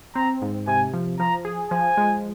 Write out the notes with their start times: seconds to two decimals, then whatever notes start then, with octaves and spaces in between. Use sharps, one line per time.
0.15 C4 A#5
0.42 G#2
0.67 C3 G#5
0.93 F3
1.19 F3 A#5
1.45 G#4
1.71 F3 G#5
1.97 G#3